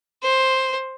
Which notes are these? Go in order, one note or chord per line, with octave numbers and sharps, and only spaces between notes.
C5